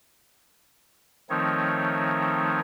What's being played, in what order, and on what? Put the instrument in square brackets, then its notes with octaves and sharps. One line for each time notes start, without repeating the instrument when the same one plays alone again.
[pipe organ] D#3 F3 A3 C4 D#4 C#5